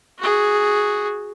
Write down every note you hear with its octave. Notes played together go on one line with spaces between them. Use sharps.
F#4 G#4